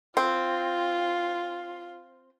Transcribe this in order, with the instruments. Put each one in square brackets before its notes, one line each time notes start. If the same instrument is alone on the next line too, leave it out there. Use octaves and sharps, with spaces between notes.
[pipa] C4 [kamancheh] F4